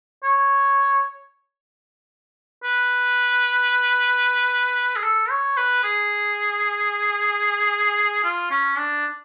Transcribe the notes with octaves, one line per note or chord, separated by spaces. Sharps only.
C#5
B4
G#4
A4
C#5
B4
G#4
F4
C#4
D4